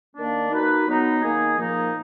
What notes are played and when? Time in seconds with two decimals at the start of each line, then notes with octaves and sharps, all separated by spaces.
0.16 D#3 A#3 D4
0.51 A#3 D#4 F#4 B4
0.87 F#3 B3 D#4
1.22 D#3 A#3 D#4 G#4
1.58 A#2 F3 A#3 D#4